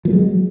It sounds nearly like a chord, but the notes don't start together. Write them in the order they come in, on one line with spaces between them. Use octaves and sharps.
F3 A#3 F#3 G#3